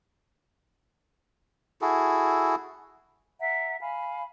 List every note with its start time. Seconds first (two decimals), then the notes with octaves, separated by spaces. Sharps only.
1.81 E4 F#4 G#4 A4
3.40 E5 F#5 A#5
3.80 F5 G#5 B5